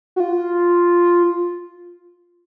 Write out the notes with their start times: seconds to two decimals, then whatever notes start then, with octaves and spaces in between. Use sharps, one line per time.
0.16 F#4
0.20 F4